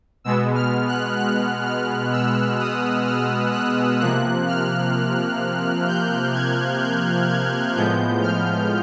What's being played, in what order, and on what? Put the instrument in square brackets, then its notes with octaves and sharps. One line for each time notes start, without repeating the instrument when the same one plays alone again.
[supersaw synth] B2 G#3 B3 E6
F6
F#6
F#6
F6
E6
D#6
F6
F#6
C3 F3 A#3 F#6
F6
G6
G#6
G6
G#6
A2 F3 G#3 B3 G6
F6